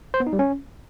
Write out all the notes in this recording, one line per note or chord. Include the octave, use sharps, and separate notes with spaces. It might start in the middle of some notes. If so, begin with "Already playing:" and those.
C5
B3
D#4
G3
C#4